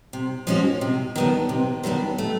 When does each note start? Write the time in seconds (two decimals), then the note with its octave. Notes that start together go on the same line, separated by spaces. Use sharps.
0.13 C3
0.47 F3 G#3 C#4 F#4
0.81 C3
1.16 D#3 F#3 B3 D4
1.49 C3
1.83 D#3 F#3 B3 D4
2.18 A3